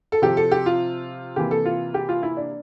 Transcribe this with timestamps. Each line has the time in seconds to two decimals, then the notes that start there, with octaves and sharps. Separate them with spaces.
0.12 A4
0.22 C3 F3 C4 G4
0.37 A4
0.52 G4
0.66 F4
1.36 C3 E3 A#3 G4
1.51 A4
1.65 F4
1.94 G4
2.09 F4
2.23 E4
2.37 D4